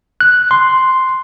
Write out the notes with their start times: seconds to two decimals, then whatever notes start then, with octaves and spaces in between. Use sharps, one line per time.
0.21 F#6
0.51 C6